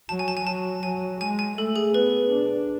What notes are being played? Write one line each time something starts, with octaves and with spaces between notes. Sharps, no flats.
F#3 A5
G#5
A5
G#5
F#3 A5
F#3 G#5
G#3 G#5
G#5
A3 A4
G#4
B3 B4
D4